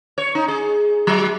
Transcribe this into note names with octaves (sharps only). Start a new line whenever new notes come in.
C#5
D#4
G#4
F#3